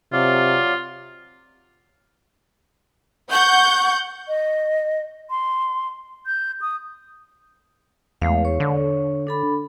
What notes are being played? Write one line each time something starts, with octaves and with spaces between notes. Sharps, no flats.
C3 F#3 F4 D5 F5
F#5 C#6 G6
D#5
C6
G6
D#6
E2 G#3 A3 F5
C#5 C#6
D3
D4 A4 B5